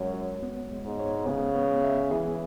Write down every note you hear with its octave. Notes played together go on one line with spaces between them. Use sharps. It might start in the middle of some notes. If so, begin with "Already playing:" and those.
Already playing: F#2 G#3 C#5
F#4
B3
G#3
G#2
C#5
C#3 B3
B3
E5
E3 G#4